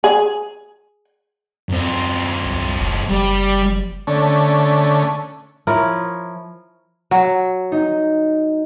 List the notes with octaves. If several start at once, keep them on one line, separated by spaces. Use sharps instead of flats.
G#4
F#2 C4
C2
F#1
F#1 G3
D3 A3 C#4
F3 E4 A#4 C#5
F#3
D#4